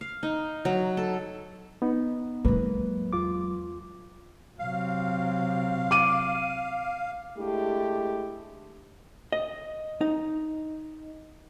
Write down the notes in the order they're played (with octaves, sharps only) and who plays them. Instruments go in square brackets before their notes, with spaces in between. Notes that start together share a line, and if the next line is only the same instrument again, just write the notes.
[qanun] F5
D#4
F#3
A4
[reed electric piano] B3 D#4
[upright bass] F#3 G#3 [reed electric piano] A#3 B4
[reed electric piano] E2 F4 D6
[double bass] C3 F#3 [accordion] F5
[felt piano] D6 D#7
[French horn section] G#3 A3 D4 E4 G4
[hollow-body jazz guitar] D#5
D#4